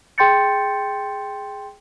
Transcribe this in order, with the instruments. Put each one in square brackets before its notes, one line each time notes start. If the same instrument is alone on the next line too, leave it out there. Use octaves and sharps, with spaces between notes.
[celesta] G#4 G5 C6 G6 A6 C#7